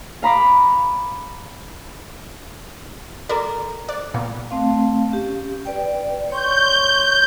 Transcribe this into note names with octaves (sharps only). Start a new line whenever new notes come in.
F5 A#5 B5 D6
F#4 A4 A#4 D5 A#5
C5 D5
A#2 A#3 B3
A3 C4 F5
C#4 G4
B4 D5 G5
C#5 C6 C#6 G6